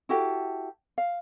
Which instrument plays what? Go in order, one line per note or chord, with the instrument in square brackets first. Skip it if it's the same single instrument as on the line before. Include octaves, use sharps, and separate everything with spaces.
[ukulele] E4 F#4 G4 A4
F5